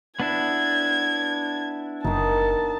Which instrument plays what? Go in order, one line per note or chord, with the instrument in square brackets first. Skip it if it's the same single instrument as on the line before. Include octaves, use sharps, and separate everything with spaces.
[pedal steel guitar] B3 D4 E4 [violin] G#6
[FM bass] F#1 [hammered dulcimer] D#3 D#4 [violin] A5